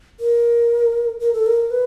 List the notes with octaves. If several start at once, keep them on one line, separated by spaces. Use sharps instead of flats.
A#4
A#4
A4
A#4
B4